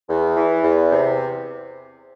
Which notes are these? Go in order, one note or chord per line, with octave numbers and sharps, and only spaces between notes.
E2
E3
E2
C3